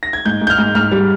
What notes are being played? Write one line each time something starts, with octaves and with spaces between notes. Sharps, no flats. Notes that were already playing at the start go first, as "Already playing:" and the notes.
A#6
G#6
G#2 G6
G#2
G6
F6
G#2
G#2 F6
G3